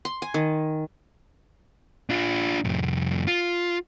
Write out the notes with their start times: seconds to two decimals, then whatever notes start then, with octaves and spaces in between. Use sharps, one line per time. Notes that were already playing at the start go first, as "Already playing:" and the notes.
0.05 C6
0.22 G#5
0.34 D#3
2.10 D4 F4
2.64 C2 F2
3.27 F4